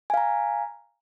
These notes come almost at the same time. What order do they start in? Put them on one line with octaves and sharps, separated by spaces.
G#5 F5 A#5